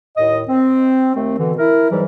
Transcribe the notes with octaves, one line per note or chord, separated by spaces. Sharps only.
D#2 A2 D#5
C4
D#2 A3 C4
B2 D3 E3
E4 A#4
G#2 E3 F#3 G3